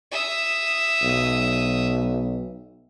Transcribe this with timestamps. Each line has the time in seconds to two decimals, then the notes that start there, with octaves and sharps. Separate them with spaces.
0.11 E5 D#6
1.02 B1